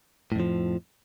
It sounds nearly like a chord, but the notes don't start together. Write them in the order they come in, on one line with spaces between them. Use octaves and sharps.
A2 F2 F3